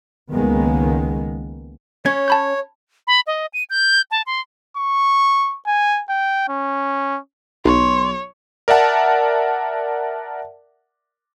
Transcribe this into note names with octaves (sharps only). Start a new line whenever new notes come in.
C#2 D#3 G#3 A#3 B3
C#4 C#5 G#6
A5 B5 G6
B5
D#5
D#7
G6
A5
C6
C#6
G#5
G5
C#4
B1 C#5 C6
A#4 D5 E5 F#5 A5